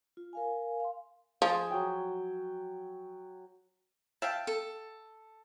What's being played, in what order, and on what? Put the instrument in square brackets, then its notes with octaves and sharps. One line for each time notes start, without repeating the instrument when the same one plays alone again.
[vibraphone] F4
A#4 F5 G#5
F5 C6
[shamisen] F3 [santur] G#4
[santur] F#3 G5
[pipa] E5 F5 G5 [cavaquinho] A5
[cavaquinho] A4